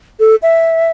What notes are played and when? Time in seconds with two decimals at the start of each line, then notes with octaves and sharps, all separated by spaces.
0.20 A4
0.42 E5